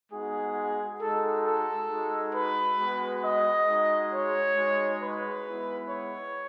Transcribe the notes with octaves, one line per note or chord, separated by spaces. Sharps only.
G#3 B3 D#4 F#4 G#4
G#3 D#4 F#4 A4
A4
G#3 D#4 F#4
B4
G#3 B3 F#4
D#5
G#3 D#4 F#4
C#5
G#3 D#4 F#4
B4
G#3 B3 E4
C#5